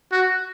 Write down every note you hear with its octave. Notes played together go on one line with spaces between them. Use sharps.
F#4